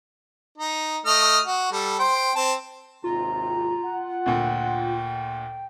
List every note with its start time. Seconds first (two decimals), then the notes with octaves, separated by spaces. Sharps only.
0.58 D#4
1.06 A3 D#5 F6
1.46 F#4
1.72 G3 A4
1.99 C5 G5
2.36 C4 A5
3.04 G#1 D#2 C3 F4 A#5
3.84 F#5
4.26 D2 A#2 G5